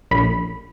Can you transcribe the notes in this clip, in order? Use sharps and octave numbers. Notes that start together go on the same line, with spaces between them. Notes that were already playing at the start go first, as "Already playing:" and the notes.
A#1 B5